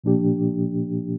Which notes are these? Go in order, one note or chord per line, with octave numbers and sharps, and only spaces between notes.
A#2 F3 A#3 D4 G4